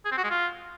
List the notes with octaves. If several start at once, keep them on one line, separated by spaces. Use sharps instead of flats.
G#4
C4
F#4
G#3
F4